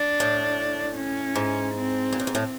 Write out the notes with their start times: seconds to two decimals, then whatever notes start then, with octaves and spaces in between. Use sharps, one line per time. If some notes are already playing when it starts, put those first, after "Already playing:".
Already playing: D4
0.20 A2
0.97 C#4
1.35 G#2
1.75 C4
2.13 A#2
2.20 A2
2.27 G#2
2.35 A2